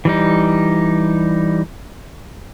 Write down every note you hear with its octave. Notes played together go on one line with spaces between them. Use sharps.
E3 G3 D#4